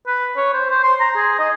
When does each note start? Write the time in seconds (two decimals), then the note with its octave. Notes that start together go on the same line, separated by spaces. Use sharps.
0.07 B4
0.37 C#5
0.54 C5
0.70 C5
0.84 C6
1.00 A#5
1.16 G#4
1.39 D#5